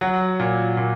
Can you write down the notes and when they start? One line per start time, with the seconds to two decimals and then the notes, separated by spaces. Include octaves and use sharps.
0.01 F#3 F#5
0.40 A#2
0.77 A#2